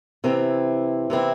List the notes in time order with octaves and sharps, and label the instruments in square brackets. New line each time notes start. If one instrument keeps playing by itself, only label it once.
[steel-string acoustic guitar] C3 E3 C4 E4
C3 E3 C4 E4